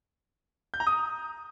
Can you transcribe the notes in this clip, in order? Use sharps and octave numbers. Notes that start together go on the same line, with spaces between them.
G6
A#5
D#6